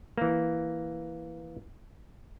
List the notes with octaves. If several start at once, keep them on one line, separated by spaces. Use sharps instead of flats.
E3 A#3